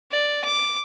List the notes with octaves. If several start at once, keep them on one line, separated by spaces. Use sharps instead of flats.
D5
D6